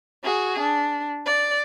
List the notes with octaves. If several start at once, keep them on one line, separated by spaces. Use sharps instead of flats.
F#4 G#4
D4
D5